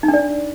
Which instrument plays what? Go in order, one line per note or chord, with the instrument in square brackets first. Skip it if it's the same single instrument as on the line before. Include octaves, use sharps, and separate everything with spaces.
[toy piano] D#4
D4
D5